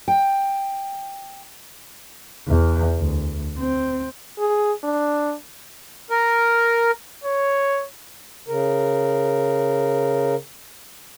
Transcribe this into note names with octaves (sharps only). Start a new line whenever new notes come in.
G5
E2
D2
C4
G#4
D4
A#4
C#5
C#3 A#4